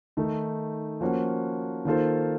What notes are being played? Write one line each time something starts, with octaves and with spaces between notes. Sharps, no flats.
D#3 A3 D#4
F3 A#3 C#4 F#4
D#3 A#3 F4 A4 C5